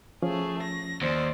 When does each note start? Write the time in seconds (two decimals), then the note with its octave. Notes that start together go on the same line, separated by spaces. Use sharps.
0.23 F3 A3 C#4 G#4
0.63 A#6
1.02 D#2 C5 D5